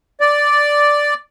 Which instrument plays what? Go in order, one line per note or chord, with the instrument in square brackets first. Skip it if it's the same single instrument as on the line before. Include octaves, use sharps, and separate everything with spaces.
[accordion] D5